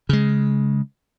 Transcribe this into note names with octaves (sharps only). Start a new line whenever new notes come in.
C#3 G#3